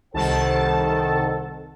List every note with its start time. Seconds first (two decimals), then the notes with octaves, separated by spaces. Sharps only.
0.14 C2 D#3 A4 C5 F#5 A5